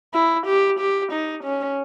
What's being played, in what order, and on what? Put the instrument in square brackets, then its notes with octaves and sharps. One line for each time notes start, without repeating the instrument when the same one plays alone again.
[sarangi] E4
G4
G4
D#4
C#4